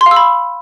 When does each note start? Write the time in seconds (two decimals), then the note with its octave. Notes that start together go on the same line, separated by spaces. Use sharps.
0.01 C6
0.06 F5
0.11 E6
0.16 B5